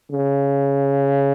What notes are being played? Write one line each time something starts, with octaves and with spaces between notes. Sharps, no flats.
C#3